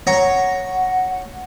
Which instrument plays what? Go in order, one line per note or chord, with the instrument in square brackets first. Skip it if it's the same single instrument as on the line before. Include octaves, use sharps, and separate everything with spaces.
[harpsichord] C#5 A#5 [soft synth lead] F#5